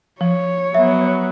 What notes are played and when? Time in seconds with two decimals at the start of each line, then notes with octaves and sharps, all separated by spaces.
0.21 F3 C#5
0.75 F#3 B3 E5